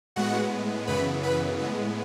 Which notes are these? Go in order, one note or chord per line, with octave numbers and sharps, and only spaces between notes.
A2 G#3 B3 F#4 F#5
F#2 C#3 E3 B3 B4 B5
B4 B5
A2 G#3 B3